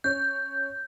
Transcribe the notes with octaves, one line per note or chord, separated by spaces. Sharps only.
C#4 G6